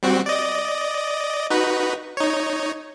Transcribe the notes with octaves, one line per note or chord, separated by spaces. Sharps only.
G3 C4 F#4
D5 D#5
D#4 F#4 B4
D#4 C#5